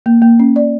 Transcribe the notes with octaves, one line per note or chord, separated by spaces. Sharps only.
A#3
A#3
C#4
D5